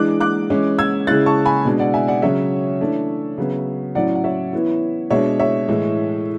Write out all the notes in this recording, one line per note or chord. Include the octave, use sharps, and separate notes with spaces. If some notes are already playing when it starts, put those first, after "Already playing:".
Already playing: E3 G#3 D4 D6 F#6
D6 F#6
E3 G#3 C#4 E4
E6 G#6
C#3 G#3 C#4 E4 F#6 A6
A5 C#6
G#5 B5
B2 G#3 D4
D5 F#5
E5 G#5
D5 F#5
C#3 F#3 C#4 C#5 E5
E3 A3 D4
C#3 F#3 B3
A2 F#3 C#4 E4 D5 F#5
F#5
C#5 E5
E3 B3 E4
B2 G#3 D4 C#5 E5
C#5 E5
A2 E3 G#3